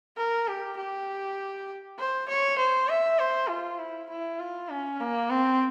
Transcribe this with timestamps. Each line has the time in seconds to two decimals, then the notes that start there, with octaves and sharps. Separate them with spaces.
0.17 A#4
0.48 G4
0.77 G4
1.99 C5
2.29 C#5
2.59 C5
2.89 E5
3.19 C5
3.49 F4
3.79 E4
4.10 E4
4.39 F4
4.69 C#4
5.00 A#3
5.30 C4